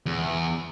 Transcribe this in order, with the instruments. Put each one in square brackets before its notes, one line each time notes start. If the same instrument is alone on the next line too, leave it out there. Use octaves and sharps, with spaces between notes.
[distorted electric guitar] E2